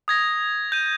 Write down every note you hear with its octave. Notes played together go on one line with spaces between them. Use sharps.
D#6 G#6 A#6
G6 D#7